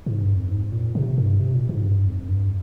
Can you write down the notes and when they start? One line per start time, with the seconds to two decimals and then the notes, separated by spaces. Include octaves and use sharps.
0.06 G#2
0.21 G2
0.36 F2
0.51 G#2
0.72 A#2
0.95 C3
1.18 G2
1.40 C3
1.55 A#2
1.69 G#2
1.84 G2
2.06 F2
2.29 G2